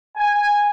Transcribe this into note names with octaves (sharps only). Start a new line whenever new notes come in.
G#5